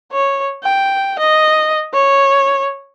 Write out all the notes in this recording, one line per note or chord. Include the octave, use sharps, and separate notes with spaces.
C#5
G5
D#5
C#5